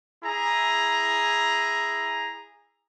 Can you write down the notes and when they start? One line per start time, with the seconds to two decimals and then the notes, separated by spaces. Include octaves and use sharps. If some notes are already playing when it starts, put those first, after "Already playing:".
0.23 E4 G#4 A#5